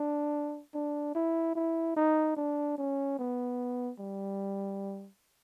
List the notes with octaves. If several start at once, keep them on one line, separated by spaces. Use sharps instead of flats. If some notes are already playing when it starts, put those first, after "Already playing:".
Already playing: D4
D4
E4
E4
D#4
D4
C#4
B3
G3